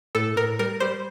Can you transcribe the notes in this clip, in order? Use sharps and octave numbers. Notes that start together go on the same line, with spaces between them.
A2 A4
A2 A#4
G3 A#4
G3 C5